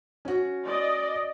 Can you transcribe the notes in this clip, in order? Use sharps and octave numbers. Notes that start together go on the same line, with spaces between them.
C#4 F#4
D5 D#5